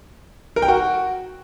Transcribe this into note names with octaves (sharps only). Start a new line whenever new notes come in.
A#4
G5
F#4